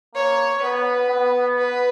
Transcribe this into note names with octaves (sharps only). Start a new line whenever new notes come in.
A#3 C#5
B3 B4
B3
B4